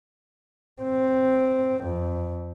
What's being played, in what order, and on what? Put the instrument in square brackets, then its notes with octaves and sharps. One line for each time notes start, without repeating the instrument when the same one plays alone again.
[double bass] C4
F2